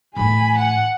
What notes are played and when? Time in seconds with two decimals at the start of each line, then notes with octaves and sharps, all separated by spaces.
0.16 A2 E3 G#5 B5
0.58 F#5